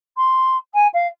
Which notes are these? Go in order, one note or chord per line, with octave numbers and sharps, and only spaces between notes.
C6
G#5
F5